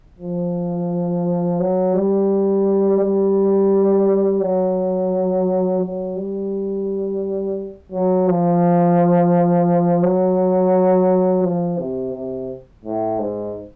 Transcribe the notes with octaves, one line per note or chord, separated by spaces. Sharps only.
F3
F#3
G3
G3
F#3
F#3
G3
F#3
F3
F#3
F3
C3
C3
A2
G#2